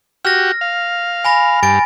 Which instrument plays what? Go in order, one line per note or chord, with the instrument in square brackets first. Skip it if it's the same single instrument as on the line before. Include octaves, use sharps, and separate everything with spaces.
[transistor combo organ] F#4 G4 [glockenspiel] F6 A#6
[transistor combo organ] F5
[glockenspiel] G#5 B5 A#6
[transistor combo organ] G2 [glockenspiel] G#5 A6 D7